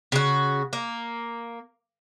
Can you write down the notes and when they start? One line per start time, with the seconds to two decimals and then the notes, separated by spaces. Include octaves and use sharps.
0.12 C#3 F#4
0.73 A#3